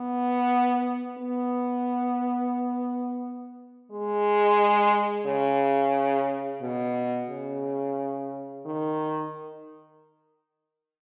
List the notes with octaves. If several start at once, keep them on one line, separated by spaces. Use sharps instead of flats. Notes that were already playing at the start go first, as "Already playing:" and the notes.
Already playing: B3
B3
G#3
C#3
B2
C#3
D#3